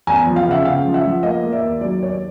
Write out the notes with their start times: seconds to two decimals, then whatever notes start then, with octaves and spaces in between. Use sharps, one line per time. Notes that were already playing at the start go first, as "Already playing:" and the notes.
0.07 E2 G#5 A#5
0.27 F3
0.36 F5 G5
0.46 C#3 E5 F#5
0.65 C#3 F5 G5
0.85 F3
0.94 E5 F#5
1.04 F3
1.23 A#3 D#5 F5
1.43 A#3
1.52 D5 E5
1.62 D#2
1.81 F#3 D5
2.01 D#2 C#5
2.10 D5